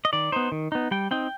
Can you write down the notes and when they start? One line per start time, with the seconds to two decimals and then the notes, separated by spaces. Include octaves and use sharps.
0.05 D#5
0.13 D#3 D5
0.32 B3 D#4 C5
0.52 D#3
0.72 B3 D#4
0.91 G3 G5
1.11 C4 D#4 G5